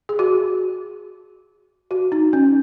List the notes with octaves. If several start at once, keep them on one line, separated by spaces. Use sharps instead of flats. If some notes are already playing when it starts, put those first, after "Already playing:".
G#4
F#4
F#4
D#4
C#4